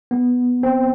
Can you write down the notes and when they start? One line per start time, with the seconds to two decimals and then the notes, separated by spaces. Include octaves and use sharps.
0.11 B3
0.63 C4